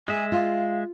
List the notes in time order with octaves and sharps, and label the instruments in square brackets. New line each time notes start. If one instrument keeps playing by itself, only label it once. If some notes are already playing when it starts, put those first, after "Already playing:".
[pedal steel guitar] G#3 E5 [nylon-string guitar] G#4 [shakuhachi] G#5
[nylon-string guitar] F4 [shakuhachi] F5